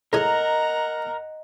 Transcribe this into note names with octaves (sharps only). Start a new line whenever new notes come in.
A2 G#3 A#4 D#5 F#5 G#5 A#5